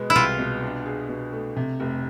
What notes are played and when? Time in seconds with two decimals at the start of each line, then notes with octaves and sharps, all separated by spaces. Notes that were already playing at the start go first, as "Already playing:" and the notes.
Already playing: B2 G#3 B3
0.10 E4
0.15 C2 F4
0.39 B2
0.63 D4
0.86 G#4
1.09 B2
1.32 A3
1.56 C3
1.80 F1